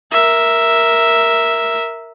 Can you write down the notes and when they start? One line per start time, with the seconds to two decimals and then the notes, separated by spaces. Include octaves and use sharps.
0.12 A#4 E5